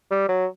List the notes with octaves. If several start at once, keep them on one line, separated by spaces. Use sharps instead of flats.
G3
F#3